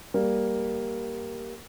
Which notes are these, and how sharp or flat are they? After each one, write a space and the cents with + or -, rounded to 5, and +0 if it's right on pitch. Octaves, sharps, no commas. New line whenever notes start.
G3 +0 A#3 +0